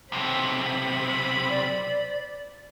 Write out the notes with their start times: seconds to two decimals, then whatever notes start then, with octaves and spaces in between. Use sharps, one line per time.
0.12 B1 C3 C5 B5
1.49 D5